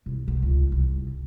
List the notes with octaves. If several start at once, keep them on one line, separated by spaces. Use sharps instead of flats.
C2
B1
C#2
C2